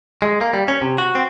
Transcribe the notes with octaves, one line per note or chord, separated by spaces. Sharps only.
G#3
A#3
G3
C#4
C3
F#4
C4